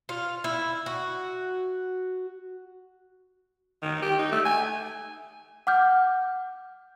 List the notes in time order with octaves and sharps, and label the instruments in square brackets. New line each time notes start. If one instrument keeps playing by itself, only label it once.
[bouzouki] F4
E4
F#4
[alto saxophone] D#3
G4
D#4
A3
G#5
[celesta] F#5 D6 F6 G6